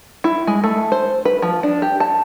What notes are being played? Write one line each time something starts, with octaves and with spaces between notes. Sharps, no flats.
E4
G#3
A3
C5
B4
F3
D4
G4
A5